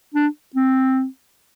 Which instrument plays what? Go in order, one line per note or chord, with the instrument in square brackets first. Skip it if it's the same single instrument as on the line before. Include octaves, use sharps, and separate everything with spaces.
[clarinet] D4
C4